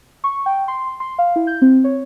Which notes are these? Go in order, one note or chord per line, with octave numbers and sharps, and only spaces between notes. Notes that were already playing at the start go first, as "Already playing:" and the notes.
C#6
G5
C6
C6
F5
E4
G6
C4
C#5